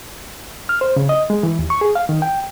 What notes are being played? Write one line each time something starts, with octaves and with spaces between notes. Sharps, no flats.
F6
C5
C#3
D#5
G#3
E3
D#2
C#6
G#4
F5
D#3
G5